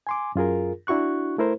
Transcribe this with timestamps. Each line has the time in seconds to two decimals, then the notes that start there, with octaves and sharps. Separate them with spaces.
0.07 G#5 C6 D6
0.35 F#2 F4 G#4 A#4
0.87 D4 E4 F#4 C#6 F#6
1.38 A3 E4 A#4 C5